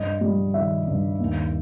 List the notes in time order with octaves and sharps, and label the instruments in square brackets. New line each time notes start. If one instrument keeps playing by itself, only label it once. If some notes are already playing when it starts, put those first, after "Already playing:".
Already playing: [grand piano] G2 D#5
G3
D#3 E5
G2
D#2